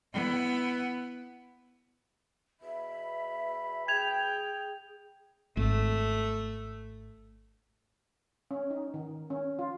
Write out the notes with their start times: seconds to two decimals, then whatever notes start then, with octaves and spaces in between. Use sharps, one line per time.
0.12 B3 E4
2.61 E2 B2 E5 B5
3.88 G#4 G5 G#6 F7
5.57 G#1 A3
8.51 C#4
8.71 D#4
8.94 D#3
9.30 C#4
9.59 F4